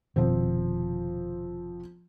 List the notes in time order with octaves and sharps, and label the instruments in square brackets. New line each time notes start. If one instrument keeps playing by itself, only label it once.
[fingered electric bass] F1 B2 D#3 [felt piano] F3 C4